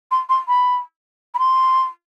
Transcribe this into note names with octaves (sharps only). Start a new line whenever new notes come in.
C6
C6
B5
B5
C6